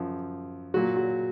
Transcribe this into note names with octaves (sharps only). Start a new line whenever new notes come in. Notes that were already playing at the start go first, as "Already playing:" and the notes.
Already playing: F#2 F3
A#2 F#3 F#4
F#4